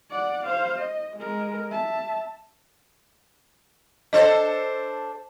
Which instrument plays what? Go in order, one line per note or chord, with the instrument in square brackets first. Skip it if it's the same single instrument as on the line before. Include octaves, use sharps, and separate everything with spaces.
[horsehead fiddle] D5 F#5
C5 F5
D#5
G#3 A#4
E5 A5
[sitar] D4 A4 C5 [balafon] D#5